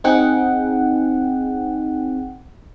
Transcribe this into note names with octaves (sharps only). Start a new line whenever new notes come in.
C4 D#4 G#4 F#5 G5